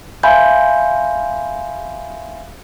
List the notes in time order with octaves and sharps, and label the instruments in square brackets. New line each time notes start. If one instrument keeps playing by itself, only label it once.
[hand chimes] E5 F5 G#5 B5 C6 G6